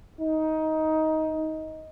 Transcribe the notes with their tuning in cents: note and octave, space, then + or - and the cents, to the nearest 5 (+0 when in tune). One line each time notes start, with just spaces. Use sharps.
D#4 +15